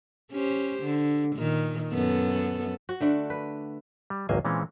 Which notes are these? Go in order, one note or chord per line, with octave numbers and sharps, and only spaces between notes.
C#4 G4 C5
D3
A#2 D#3
F#2 B3 A4
F#4
D3 A3 D4
B4
G3
G#1 C#2 F#3 A#3 C5 G#5
A#2 E3 G#3 C4 C#4